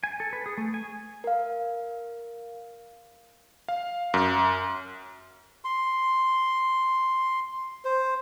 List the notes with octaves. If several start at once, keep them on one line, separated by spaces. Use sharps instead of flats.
G#5
A4
B4
G#4
A3
G#5
A#4 F5
F5
F#2
C6
C5